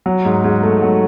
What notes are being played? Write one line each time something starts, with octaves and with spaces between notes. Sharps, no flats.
F#3
G#2
G#2
A3
F#3